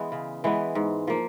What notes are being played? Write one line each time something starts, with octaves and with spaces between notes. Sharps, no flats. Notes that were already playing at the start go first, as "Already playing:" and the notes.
Already playing: E3 G#3 B3
C#3
E3 G#3 B3
G#2
F3 A#3